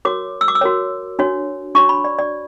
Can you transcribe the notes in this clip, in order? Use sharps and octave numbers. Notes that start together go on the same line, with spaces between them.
F#4 A#4 C#5 D6
E6
D6
E6
F#4 A#4 C#5
D4 F#4 C#5
D4 F#4 C#5 C#6
B5
D5
D5